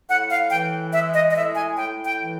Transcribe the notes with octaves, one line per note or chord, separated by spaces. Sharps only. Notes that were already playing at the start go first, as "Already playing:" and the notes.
A2 F#5
F5
E3 G5
G#3 E5
D#5
D#5
A2 E5
G#5
A2 G5
G5
E3